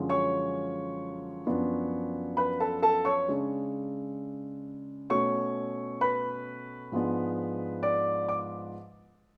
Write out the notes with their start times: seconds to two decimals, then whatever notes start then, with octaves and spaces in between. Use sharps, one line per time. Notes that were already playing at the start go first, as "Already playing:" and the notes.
Already playing: F#2 D3 F3 G#3 C#4
0.09 C#5 C#6
1.47 F#2 F3 B3 D4
2.37 B4 B5
2.60 A4 A5
2.82 A4 A5
3.05 C#5 C#6
3.28 C#3 G#3 D4
5.10 B2 A3 C#4 C#5 C#6
6.01 B4 B5
6.92 G#2 F3 G#3 B3 D4
7.83 D5 D6
8.29 D6